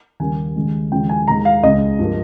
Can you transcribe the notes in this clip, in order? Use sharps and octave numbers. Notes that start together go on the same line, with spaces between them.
D#2 C#3 G3 A#3 G#5
D#2 C#3 G#3
D#2 C#3 F3 G#3 G5
G#5
D#2 D#3 G#3 A#5
F5
C#2 C#3 G#3 D#5
G2 F3 A#3